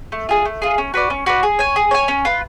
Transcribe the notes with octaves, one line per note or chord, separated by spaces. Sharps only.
A3
F4 G#4
A3
F4 G#4
C#4
F#4 B4 D5
C#4
F#4 B4 D5
G#4
C#5 G#5
G#4
C#5 G#5
C#4
F4 B4